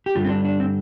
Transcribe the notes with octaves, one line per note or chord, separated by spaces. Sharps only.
G4
G2 D3 G3 F4
C4
D4
D4
C4